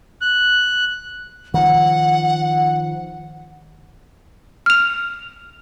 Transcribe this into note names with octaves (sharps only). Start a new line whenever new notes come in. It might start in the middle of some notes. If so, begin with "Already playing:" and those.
F#6
D#3 F3 F#5
F6 F7